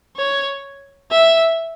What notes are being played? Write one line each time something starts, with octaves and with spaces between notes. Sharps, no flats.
C#5
E5